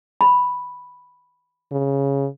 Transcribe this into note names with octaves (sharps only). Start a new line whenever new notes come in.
B5
C#3